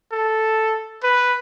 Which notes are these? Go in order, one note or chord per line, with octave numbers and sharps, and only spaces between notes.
A4
B4